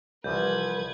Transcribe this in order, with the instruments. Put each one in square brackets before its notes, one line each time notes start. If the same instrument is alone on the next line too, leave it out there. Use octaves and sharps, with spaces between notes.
[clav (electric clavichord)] C2 E3 F3 [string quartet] B4 G#6 [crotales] G6